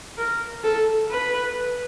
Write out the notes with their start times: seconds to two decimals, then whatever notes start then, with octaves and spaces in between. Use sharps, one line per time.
0.18 A#4
0.64 A4
1.11 B4